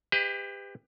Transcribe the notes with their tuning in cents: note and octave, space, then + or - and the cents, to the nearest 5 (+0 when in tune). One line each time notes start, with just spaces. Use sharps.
G4 +30 B4 +35 D#5 +45